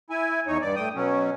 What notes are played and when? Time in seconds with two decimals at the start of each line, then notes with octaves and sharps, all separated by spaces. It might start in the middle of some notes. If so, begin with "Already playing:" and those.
0.10 E4 G#5
0.47 E2 D#4 C#5
0.61 G2 D5
0.76 A2 G5 D#6
0.95 B2 F#3 C#4